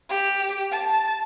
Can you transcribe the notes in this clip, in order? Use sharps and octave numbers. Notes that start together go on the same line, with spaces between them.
G4
A5